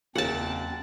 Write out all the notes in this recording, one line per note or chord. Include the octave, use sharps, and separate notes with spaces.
F#1 E2 F#3 A#3 C4 C#4 F#5 A5